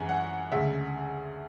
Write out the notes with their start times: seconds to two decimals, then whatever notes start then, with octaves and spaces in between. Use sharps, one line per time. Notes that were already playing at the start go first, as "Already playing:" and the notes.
Already playing: F#2 E3 G#3 C#4 G#5
0.09 F#5
0.52 D2 C#3 G#3 C#4 E5